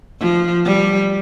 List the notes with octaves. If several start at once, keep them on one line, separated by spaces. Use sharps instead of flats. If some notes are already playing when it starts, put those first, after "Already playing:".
F3
G3